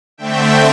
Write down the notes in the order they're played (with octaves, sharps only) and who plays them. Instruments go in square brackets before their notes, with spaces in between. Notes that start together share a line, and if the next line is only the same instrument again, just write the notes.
[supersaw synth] D3 A3 C4 E5 G5